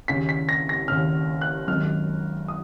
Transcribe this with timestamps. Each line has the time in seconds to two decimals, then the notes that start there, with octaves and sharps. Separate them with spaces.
0.08 D#2 C#3 B6
0.29 B6
0.49 A#6
0.69 A#6
0.88 D#2 C#3 F6
1.41 F#6
1.68 G#1 F#2 D#3 F6
2.48 D#6